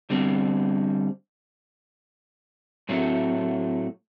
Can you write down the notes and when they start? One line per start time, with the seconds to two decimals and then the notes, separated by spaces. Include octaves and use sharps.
0.10 D3 G3 C4
2.89 A2 F#3 A3 C4